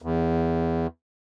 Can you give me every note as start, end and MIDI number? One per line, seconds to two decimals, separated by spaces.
0.02 0.87 40